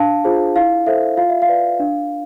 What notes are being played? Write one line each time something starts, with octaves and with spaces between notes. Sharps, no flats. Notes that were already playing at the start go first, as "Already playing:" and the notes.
Already playing: D4 F5 A5
F4 G#4 C5
E4 F5
A4 C5 E5
F4 F5
E5
F5
B4 D5
D4